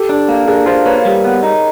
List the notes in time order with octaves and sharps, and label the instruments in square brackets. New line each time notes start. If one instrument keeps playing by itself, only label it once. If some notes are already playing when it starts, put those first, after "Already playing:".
Already playing: [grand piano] G4 A4
[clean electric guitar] D4
A#3
[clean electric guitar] D4 [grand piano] G#4 A#4
[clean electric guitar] F4 [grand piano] A#4 C5
[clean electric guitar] A#3 [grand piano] B4 C#5
[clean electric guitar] G3
B3
D#4